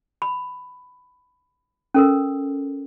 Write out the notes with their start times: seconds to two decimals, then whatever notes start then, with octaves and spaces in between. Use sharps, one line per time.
0.22 B5
1.94 C#4 A4 A#4